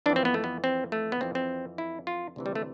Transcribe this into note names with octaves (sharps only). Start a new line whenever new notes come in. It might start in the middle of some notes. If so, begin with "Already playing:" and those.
F2 E3 D4
C4
B3
A3
B3
C4
A3
B3
F2 E3 C4
C4
E4
F4
D2 C3 E3
G3
A3